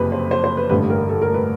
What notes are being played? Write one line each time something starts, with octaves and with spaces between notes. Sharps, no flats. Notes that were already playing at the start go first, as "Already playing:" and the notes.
Already playing: F#1 F2 C3 B4
C5
C5
C5
B4
A1 G2 D3 B4
A#4
A4
A#4
B4